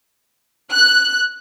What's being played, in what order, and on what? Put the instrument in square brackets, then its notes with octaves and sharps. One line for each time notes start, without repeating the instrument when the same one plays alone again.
[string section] F#6